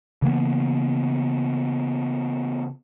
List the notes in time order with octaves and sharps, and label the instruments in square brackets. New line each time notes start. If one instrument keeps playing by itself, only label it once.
[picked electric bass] C#3 E3 A#3 B3